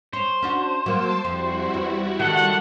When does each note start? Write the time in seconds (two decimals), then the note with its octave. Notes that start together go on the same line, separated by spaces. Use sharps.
0.13 C5 C#5
0.42 C#4 D4 F#4
0.86 F#3 A#3 A5 D6 E6
1.25 F2 G3 E4 F#4
1.74 E2
2.20 C#2 D#3 A4 F#5